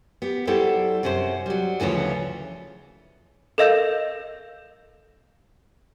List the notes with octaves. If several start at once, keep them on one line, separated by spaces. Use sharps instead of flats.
B3 G4
F#3 G3 E4 G4 A4 C5
F#2 C3 C#4 B4 C5
F#3 G3
D2 C#3 E3 F3 C#5
A4 A#4 D#5 F5 E6 G6